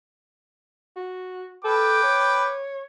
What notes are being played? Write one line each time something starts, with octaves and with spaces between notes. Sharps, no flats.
F#4
A4 B4 G5 D6
C#5